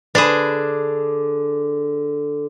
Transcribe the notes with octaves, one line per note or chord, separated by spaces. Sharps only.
D3 D4 G#4 B4